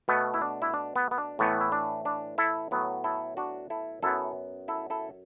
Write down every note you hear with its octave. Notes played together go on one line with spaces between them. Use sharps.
B2 A3 B3
E4
D4
E4
D4
B3
B3
D4
A2 E3 A3 B3
E4
D4
D4
E4 A4
A2 F#3 B3
E4 A4
D4 F#4
E4 A4
F#2 F#3 B3 E4 A4
E4 A4
E4 A4